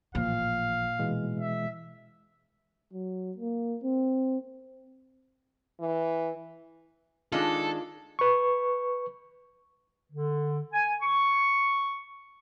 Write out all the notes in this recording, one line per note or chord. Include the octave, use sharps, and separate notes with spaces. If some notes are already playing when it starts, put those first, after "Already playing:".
A1 A#2 F3 F5
B2 E3 G#3
E5
F#3
A#3
C4
E3
D#3 G#3 D4 F4 A4
B4 C#6
D3
G#5
C#6